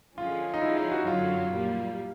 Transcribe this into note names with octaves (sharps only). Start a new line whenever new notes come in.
D3 F3 G#3 C#4 F4
D#4
F3 G#3 C#4 E4
D#4
F#4
F#2 D3 F#3 F4
A#2 G3 A#3